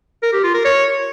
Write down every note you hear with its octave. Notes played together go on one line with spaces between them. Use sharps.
A#4
G4
F4
A#4
C#5